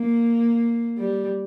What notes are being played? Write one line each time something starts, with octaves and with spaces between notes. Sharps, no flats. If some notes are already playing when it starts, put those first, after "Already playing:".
Already playing: A#3
G3